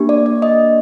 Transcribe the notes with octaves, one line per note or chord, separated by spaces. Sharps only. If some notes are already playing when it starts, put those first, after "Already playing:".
Already playing: A#3 D4 G4
D5
D5
D#5